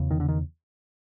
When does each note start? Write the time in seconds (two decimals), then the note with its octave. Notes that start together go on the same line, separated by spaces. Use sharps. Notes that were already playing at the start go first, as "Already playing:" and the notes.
Already playing: E2 C#3
0.11 D#3
0.20 D3
0.28 D#3